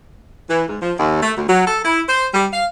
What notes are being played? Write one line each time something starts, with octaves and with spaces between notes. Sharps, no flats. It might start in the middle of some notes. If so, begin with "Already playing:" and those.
E3
G#2
F3
D#2
A3
D2
F#3
A4
E4
C5
G3
F5